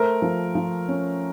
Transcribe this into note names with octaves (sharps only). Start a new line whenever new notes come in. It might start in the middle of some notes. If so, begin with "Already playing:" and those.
Already playing: A3 A#4 C5
F3
F3
C#4